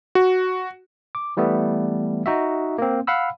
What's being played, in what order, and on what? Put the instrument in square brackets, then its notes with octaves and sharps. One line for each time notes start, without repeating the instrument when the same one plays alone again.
[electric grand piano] F#4
[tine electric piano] D6
E3 G3 A3 B3
D#4 F#4 E5
A#3 C4
F5 F#5 B5 E6